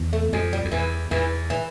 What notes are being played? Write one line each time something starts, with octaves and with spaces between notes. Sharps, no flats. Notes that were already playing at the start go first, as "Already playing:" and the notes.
Already playing: E2
A3
F2 G#3
G3
F2
E2 E3
E2 E3
E3